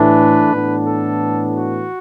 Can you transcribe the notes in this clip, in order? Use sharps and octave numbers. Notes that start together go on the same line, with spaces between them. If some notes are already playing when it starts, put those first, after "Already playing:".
Already playing: A2 E3 A3 D4 B4
A2 E3 B3 D4
A4
F#4